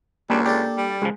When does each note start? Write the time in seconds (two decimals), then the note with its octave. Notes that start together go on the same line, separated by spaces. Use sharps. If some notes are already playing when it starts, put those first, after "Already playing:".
0.30 C#2 G3 A#3 D4
0.46 D4 G4 A4
0.77 G3
1.02 C#2 F3 G#3